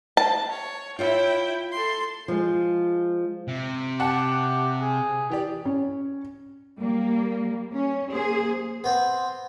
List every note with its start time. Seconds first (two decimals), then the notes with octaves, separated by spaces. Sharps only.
0.17 A5
0.50 C#5
0.99 E4 F4 C#5 E5 G5
1.72 A4 C6
2.28 F3 G#3
3.48 C3
4.00 G4 F#5 A5
4.82 G#4
5.30 E3 G4 D5
5.65 C#4
6.79 G3 A#3
7.72 C#4
8.11 A#3 G#4 C5
8.84 B3 C4